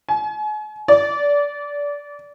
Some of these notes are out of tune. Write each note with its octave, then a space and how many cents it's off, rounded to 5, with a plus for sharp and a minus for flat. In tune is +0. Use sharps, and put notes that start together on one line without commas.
G#5 +35
D5 -25